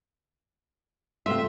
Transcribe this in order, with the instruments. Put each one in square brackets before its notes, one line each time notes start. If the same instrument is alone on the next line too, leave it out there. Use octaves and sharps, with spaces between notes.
[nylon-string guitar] C3 A3 F4 [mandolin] E5